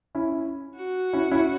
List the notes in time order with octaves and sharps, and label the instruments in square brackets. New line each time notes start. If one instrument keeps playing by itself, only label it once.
[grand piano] C#4 E4
[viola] F#4
[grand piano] C#4 E4
C#4 E4